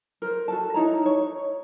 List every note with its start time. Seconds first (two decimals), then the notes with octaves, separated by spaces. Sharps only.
0.22 A#4 C5
0.48 F#4 A4 A5
0.74 D#4 E4 C#5 A#5
1.06 C#5